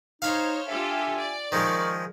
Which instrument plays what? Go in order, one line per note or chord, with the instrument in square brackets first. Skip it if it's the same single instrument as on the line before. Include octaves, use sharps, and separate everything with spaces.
[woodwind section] D#4 [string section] C5 C#5 [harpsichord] F5 B5
[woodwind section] D4 E5 G#5 [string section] F4 G4 A4
[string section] D5
[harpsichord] D#3 F3 G#3 [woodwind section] D#4 A#4 C#6